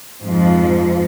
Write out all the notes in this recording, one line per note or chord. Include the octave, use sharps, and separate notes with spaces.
F2 G#2 F3